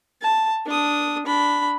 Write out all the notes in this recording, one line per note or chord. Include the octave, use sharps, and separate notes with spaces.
A5
D4 D#6
D4 B5